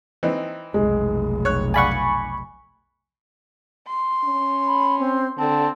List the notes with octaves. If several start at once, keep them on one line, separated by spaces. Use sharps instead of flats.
E3 C4 D#4
F1 B1 G#3
C#5 F#6
D5 F5 F#5 G#5 B5 C#6
C6
C#4
B5
C4
D3 C4 A5